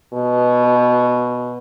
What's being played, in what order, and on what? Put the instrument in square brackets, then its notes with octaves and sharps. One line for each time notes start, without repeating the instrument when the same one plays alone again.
[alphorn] B2